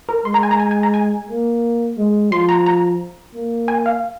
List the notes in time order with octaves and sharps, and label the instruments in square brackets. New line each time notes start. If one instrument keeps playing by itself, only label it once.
[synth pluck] A#4
[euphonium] G#3 [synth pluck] C6
[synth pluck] A#5
G#5
A#5
G#5
G#5
A#5
G#5
[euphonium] A#3
G#3
[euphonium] F3 [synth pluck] C6
[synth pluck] A#5
A#5
[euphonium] A#3
[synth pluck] G#5
F5